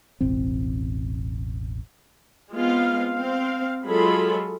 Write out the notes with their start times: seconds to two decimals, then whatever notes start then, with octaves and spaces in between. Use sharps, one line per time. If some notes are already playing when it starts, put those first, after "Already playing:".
0.21 E1 A1 C4
2.54 G#3 B3 C4 F4 F5
3.14 C4 F5
3.87 F#3 G#3 F4 G#4 A4 B5